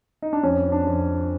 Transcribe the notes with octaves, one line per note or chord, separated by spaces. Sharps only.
D#4
D4
F2 C#4
D4
F2